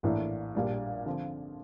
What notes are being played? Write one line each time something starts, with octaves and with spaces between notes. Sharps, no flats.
A#1 A2 E3 A#3 D4
A#1 A#2 G3 D4
D3 F3 C4